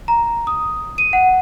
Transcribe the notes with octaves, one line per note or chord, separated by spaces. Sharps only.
A#5
D#6
D#7
F#5